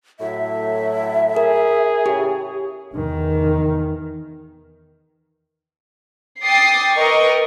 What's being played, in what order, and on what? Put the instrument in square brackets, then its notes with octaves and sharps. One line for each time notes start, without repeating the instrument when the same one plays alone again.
[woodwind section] A2 F#3 [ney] E5
[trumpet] G#4 [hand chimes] A#4
[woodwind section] A2 C#3 [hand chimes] G4
[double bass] E2 D#3
[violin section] G5 D6 D#6 A6 C7
A#4 B4 D#5 G5 C#6